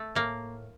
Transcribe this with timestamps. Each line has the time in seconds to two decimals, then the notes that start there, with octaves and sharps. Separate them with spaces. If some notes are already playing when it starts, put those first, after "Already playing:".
Already playing: A3
0.15 A2 A#3